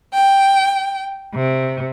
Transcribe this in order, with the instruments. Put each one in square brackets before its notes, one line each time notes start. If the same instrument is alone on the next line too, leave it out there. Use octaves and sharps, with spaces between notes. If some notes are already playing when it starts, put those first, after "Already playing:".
[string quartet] G5
C3